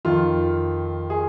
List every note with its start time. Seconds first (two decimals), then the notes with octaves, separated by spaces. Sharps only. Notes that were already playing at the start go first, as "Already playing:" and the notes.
0.05 F2 D#3 F4
1.10 G#4